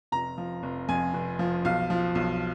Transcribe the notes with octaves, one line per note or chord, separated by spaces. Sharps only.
F1 A#5
F3
F1
F2 G#5
F1
F3
B1 F5
F3
B1